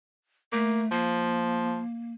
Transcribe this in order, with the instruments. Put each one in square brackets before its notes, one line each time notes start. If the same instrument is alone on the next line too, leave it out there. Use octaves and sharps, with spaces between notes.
[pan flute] A3 [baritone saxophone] A#3
[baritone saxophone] F3 [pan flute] A#3